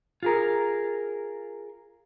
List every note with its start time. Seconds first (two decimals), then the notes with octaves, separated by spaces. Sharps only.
0.23 F4 G#4 A#4